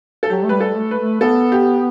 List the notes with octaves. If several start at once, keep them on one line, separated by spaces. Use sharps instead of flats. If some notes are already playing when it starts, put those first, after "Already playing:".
A4
F#3 G4
A3
G3 B4
A4
A3
B4
A3
B3 A4
G4